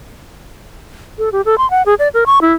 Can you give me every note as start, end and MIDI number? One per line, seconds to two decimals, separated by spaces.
1.18 1.29 69
1.32 1.41 67
1.45 1.58 69
1.58 1.69 84
1.71 1.82 78
1.86 1.94 68
1.99 2.08 74
2.14 2.24 70
2.26 2.39 85
2.41 2.54 64